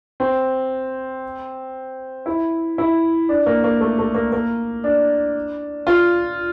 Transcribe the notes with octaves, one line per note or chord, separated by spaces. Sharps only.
C4
E4
E4
D4
A#3
A#3
A3
A3
A#3
A#3
D4
F4